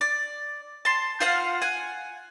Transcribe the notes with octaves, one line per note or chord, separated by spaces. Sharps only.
D5
A5 C6
F4 C5 F5 F#5
F#5 G#5